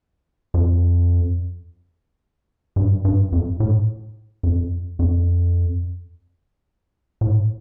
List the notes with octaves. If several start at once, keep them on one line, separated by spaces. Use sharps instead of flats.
F2
G2
G2
F2
A2
F2
F2
A2